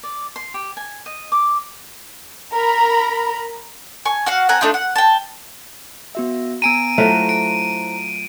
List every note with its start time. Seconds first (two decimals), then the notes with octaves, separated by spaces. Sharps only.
0.03 D5
0.36 C6
0.54 G4
0.77 G#5
1.06 D#5
1.32 D6
2.54 A#4 A#5 B5
4.05 G#5 C#6
4.26 F#4 F5 F#5
4.49 C4 F#5 G#5 A#5
4.61 A3 D4 D#4 F4
4.74 F#5
4.96 G5 A5
6.15 B3 F#4 E5
6.62 B3 G#5 A#5 D7 D#7
6.98 F#3 A3 E4 F4 C5 A#5
7.29 D7